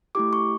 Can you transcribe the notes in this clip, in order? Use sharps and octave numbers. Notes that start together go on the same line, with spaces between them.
A3 E4 G4 D6
C#6